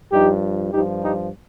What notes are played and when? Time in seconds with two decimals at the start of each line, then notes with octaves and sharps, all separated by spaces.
0.12 G2 F3 D#4 G4
0.73 G2 F3 D#4 G4
1.04 D#4 G4